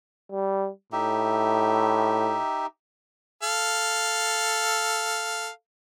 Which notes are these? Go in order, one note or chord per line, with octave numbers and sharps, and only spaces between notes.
G3
A2 D#4 G4 E5
A4 F5